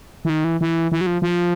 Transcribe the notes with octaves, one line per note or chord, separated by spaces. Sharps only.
E3
D#3
E3
E3
E3
F#3
F3
F3